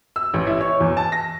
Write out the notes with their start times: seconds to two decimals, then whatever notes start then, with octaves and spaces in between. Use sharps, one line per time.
0.16 E6
0.34 A1
0.47 E4
0.61 C#5
0.80 E2
0.97 A5
1.12 A#6